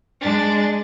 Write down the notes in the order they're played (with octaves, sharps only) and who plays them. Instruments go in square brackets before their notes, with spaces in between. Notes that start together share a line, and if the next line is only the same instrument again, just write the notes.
[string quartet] G#3 D4 A6